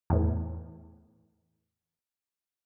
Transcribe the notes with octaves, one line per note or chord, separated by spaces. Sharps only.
E2 A2